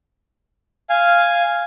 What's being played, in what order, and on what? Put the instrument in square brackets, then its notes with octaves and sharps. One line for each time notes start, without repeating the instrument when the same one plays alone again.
[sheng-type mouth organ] F5 G#5